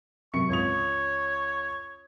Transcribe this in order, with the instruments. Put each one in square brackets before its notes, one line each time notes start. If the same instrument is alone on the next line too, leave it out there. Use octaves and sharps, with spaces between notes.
[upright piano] F#2 C3 C#7 [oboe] C#6
[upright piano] C#2 D#6 F7 [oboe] C#5